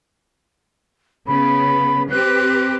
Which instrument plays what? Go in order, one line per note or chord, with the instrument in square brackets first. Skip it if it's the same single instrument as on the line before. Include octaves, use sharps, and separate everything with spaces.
[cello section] C#3 B3 [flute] B5
[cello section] C4 G4 B4 [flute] F#6